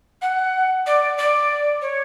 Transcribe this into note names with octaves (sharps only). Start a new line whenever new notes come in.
F#5
D5
D5
C#5